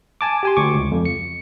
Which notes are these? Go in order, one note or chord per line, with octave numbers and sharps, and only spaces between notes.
G#5 A5 D6
G4 G#5 C6
D2 C#6 D6
C#2
F2
C#7